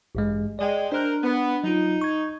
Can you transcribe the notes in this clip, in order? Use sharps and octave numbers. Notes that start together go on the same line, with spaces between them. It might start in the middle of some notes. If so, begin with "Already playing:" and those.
A1 G2 G#3
G#3 D5 G5
D4 A#4 C5 F#6
B3
F#3 D#4 F4
C#6 G#6